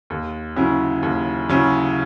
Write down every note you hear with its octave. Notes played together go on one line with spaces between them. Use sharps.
D#2
C#3 F#3 C#4 E4
D#2
C#3 F#3 C#4 E4